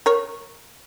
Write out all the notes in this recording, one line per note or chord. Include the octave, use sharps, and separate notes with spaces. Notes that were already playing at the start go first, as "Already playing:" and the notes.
A#4 C#5